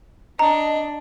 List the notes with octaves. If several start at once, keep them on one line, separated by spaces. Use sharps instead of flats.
D4 D#5 A#5